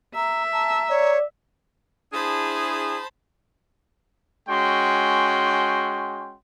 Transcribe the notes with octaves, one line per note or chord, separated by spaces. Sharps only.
E5 A#5
A5 A#5
C#5 D5
D4 E4 G#4 C5 A5 B5
G#3 C#4 F#4 G5 C6